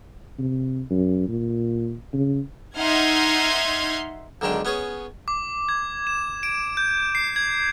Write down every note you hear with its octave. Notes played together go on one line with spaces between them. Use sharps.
C3
F#2
A#2
C#3
D#4 E5 F#5 C6 F6 G#6
B1 D3 D#3 G#3 D4 G5
B3 C#4 G#4 C#5
D6
G#6
E7
D7
G6
C7
G#6